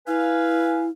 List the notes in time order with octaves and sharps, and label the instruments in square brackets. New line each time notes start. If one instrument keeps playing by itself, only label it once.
[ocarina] E4 [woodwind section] B4 F5 G#5